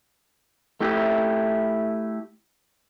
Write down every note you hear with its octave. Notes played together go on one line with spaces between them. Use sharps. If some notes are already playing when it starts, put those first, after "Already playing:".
A3 E4 G4